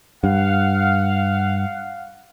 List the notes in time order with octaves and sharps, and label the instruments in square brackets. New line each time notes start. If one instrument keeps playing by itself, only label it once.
[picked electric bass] G2 [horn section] F5 F#5